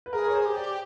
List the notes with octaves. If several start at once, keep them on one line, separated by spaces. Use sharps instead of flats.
B4
G#4 A#4
C#5
C5
G4
D5